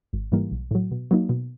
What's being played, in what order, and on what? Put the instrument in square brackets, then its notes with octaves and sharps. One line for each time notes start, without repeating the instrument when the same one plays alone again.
[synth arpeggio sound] G#1
G#2 E3 G3 A#3
B1
A2 F#3
B2
F#3 A#3 D#4
B2